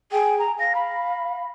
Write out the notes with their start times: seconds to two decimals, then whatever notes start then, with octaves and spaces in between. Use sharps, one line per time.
0.12 G#4 G5
0.39 A#5
0.59 F5 A#6
0.75 B5